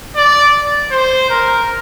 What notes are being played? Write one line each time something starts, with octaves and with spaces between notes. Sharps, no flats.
D5
C5
A#4